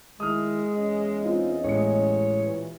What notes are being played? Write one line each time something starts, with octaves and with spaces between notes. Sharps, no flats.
D#3 G#3 E4 D#6 F6
E2 C#4 D#5
C4 D#4 F4
A1 G#3 C#5 C#7
A#2 E3 G4